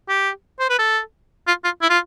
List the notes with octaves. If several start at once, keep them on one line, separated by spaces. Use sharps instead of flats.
G4
C5
B4
A4
F4
F4
E4
F4